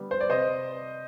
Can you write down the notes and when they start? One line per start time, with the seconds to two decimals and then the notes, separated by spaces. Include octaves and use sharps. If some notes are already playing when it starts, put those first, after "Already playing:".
Already playing: D3 G3 B3
0.11 C5
0.21 D5
0.30 C3 C5 D#5